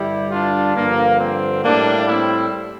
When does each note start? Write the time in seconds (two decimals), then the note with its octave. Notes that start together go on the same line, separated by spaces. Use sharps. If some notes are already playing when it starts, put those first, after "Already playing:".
Already playing: G2 D3 G3 E4 G4
0.31 D4 F4
0.75 G2 D3 F3 A#3
1.20 C4
1.63 A2 G3 A#3 D4
2.08 C4 E4